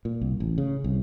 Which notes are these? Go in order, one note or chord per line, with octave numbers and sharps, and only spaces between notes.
A#2
C2
A1
C#3
C2